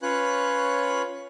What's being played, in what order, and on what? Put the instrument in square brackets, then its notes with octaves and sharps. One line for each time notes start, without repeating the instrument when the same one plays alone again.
[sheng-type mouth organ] C#4 F4 B4 C#5 F#6